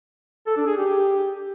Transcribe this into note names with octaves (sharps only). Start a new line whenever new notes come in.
A4
D4
G#4
G4